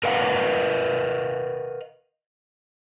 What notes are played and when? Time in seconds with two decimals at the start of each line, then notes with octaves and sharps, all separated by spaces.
0.04 A#4 B4 D#5 F5 F#5